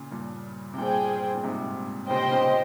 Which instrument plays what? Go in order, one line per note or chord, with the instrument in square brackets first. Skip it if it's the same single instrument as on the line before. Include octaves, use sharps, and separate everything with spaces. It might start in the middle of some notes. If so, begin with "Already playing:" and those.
Already playing: [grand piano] A#2 C#3
G2 A#2
C3
[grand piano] G2 A#2 [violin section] G#4 C5 G5
[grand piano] A#2
G#2 C3
[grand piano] A#2 C#3 [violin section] G4 C5 D#5 G5
[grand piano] A#2 C#3